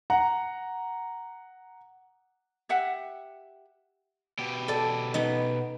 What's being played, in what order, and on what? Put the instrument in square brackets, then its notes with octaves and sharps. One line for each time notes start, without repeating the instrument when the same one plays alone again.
[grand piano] F#5 A#5
[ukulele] G4 E5 F#5 G5
[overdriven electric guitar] B2 G4
[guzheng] A4 D5
B3 D#4